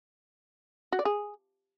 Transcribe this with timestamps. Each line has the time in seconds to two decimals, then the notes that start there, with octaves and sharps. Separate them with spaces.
0.92 F#4
0.99 D5
1.05 G#4